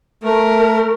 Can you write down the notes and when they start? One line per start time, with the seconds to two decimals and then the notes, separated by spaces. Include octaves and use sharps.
0.24 A3 A#4